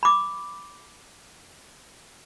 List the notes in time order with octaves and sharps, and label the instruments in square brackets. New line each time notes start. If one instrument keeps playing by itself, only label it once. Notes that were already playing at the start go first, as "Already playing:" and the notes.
[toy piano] B5 D6